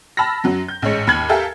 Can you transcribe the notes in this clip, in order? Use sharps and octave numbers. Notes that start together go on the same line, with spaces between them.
A5 B5 E6 F6 A#6
F#2 F#3
G6
A1 G#2 G#3 C#5 C#7
D#2 B5 F6 G#6 F#7
G4 A4 A#4 E5 F5 G#5